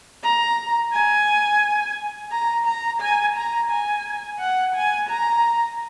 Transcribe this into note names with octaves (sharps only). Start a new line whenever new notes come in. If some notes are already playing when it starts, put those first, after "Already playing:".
A#5
G#5
A#5
A#5
G#5
A#5
G#5
F#5
G#5
A#5